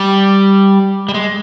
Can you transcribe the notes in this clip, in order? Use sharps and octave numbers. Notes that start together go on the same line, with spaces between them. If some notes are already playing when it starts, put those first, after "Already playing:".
Already playing: G3
G3
G#3